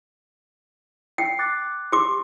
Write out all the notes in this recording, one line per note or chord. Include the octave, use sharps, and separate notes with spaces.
G5 C7
D6 F#6 A6
G4 C6 D6